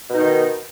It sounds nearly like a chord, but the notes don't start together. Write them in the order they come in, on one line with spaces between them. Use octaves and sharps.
B2 D#4 D#3